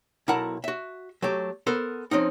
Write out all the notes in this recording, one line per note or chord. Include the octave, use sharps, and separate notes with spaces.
B1 E4 A#4 F#5 A5 A#5
F#4 E5
F#3 A3 G4
B3 A4 A#4 C5
F3 C4 C#4 D#4